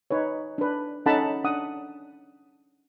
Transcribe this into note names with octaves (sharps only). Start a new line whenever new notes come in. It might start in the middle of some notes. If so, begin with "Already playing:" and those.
D#4 B4 C#5
D4 B4
C#4 D#4 A4 F#5 A5 B5
D4 F#5 D#6